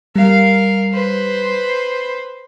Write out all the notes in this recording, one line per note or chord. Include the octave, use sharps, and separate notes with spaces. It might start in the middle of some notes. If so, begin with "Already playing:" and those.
G3 A#4 F5
B4 C5